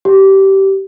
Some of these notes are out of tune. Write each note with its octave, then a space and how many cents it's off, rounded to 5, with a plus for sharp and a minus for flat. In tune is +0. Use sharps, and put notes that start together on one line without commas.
G4 -20